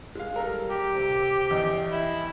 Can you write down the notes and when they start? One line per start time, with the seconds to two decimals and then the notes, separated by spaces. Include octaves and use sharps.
0.15 G#3 F5
0.36 G3 A4 A#4
0.71 G4
0.95 C3
1.51 E2 D#5
1.91 E4